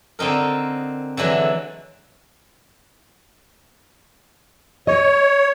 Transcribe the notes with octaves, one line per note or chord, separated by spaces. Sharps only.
D3 C4 D#4 A#4
D3 E3 F#3 G#3
C#5 D#5